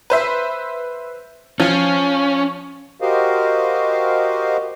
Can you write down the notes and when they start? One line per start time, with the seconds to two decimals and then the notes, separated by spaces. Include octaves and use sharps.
0.10 B4 C5 E5
1.60 F3 C#4 F5
3.01 F#4 G4 A#4 C5 D#5 F5